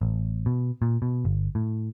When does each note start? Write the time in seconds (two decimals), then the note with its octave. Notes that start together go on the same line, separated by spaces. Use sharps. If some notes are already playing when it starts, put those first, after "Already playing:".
0.01 A1
0.46 B2
0.82 A#2
1.02 B2
1.25 G1
1.55 A2